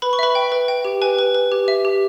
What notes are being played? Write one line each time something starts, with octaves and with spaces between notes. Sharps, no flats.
B4 B5
C#6
B4 E5 B5
G5
B4
G5
G4
B4 G#5
B4
B4
G4
E5
G4